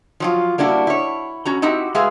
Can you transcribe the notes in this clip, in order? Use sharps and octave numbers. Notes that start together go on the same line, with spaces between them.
F3 F#3 F4
G3 A#3 D4 E4 F#4
E4 C#5
C#4 F#4 A#5
C4 D#4 E4 F#4 G4
G#3 F#4 G#4 B4 E5 F5